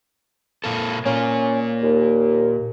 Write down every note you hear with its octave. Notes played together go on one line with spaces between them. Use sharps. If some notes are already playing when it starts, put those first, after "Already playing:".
A#2 A#3 A4
A#2 A#3 C#4
D#2